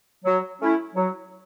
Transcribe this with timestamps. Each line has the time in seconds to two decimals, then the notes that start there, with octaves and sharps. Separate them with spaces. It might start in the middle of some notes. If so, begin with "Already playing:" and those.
0.25 F#3
0.61 A3 C#4 E4
0.96 F#3